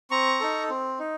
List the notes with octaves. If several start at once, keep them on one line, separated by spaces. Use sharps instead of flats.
C4 A#5 C#6
D#4 A4
C4
D#4